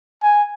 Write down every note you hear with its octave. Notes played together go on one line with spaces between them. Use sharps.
G#5